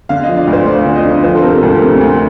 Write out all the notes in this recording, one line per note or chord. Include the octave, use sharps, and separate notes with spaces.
D3 F5
D#5
F3
D5
D2
C5
F3 D5
D3
D#5
D3
F3 C5
A4
C3 A#4
D2 A4
C3 A#4
D2